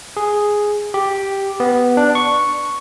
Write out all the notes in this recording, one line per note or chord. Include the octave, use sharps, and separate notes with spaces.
G#4
G4
B3
D4
C#6